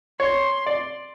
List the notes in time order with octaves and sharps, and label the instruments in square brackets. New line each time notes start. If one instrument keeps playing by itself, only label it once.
[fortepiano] C#5 [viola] C6
[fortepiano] D5